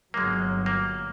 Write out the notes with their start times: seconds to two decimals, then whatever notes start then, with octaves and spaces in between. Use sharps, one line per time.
0.14 G1 F#3 G#3 A#3
0.66 A#3